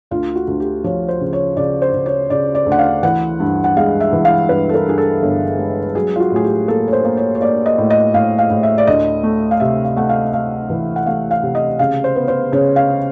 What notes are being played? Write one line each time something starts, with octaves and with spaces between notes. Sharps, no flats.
D2 F4
F#4
D2
G4
F3 C#5
C5
C#3
C#5
C#3 D5
C5
C#3
C#5
C#3 D5
D5
D2
F#5
F5
E3 F#5
G2
F#5
G#3 F5
E5
E3
F5
G2 B4
A4
A#4
G2 G#4
A4
G1
G#3
F#3 G#4
F4
F#4
A2 G#4
G4
A#3 A4
C#5
C5
A#3
C#5
C#5
A#3 D5
D#5
A2
D#5
A2 F5
F5
A2
E5
D5
D2 D#5
A3
F5
C3 E5
F5
A3 F#5
F5
A3 F5
E3
F#5
A3 F5
F5
C3
D#5
C#3 F5
C5
B3
C5
C#3 C#5
F5